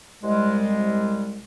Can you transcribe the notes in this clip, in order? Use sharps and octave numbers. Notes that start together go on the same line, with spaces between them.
C2 G3 G#3